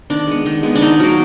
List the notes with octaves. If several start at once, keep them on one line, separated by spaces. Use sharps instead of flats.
D#3 D4
G#3 B3
D#3
G#3 B3
D4
D#3 D#4
F#3 A#3